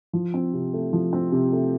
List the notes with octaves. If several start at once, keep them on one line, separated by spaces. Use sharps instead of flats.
F3
C4
C3
A3
F3
C4
C3
A3